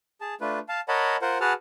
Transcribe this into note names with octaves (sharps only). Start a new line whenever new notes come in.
G#4 A5
A3 D4 F4 B4
F5 A5
A#4 C#5 D#5 F#5 A5 B5
F4 A#4 C5 F#5
F#4 G#4 B4 F#5 A5 F6